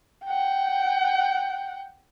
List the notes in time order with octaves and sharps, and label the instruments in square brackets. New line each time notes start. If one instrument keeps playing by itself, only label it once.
[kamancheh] F#5 G5